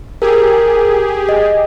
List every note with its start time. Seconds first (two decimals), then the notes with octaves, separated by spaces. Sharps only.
0.22 G4 G#4 A#4
1.29 D#5